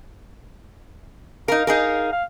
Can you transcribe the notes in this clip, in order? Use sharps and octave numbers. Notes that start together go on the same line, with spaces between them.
D#4 A#4 F5
D#4 G#4 A#4
F5